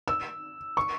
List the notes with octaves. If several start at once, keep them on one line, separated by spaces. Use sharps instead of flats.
E6
C#6